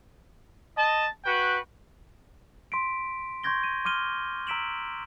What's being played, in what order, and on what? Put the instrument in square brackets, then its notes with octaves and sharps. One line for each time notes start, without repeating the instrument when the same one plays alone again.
[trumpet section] D#5 A5
F#4 B4 G5
[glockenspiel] C6 B6 D7
C6 C#6 G6 G#6 A#6 G7
D#7
C6 D6 F6 D#7 G7
A#5 E6 B6 D7 E7 F#7